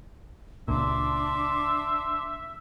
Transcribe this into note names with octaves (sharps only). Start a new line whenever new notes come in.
C#2 A#2 D4 E5 C6 D6